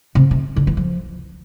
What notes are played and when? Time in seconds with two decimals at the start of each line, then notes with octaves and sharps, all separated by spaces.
0.15 C3
0.31 C3
0.56 D3
0.67 E3
0.77 F3